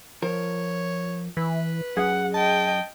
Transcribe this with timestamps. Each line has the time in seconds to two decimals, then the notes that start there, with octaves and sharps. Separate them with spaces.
0.22 F3 A#4 C#5
1.37 E3 B4
1.97 F#2 G#4 F#5
2.34 D#5 G5 A5